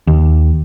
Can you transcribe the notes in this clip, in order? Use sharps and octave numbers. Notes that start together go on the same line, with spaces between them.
D#2